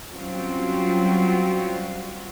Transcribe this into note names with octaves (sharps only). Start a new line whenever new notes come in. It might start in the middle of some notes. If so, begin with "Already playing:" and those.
F#3 G3 C4 C#4 F4 F#4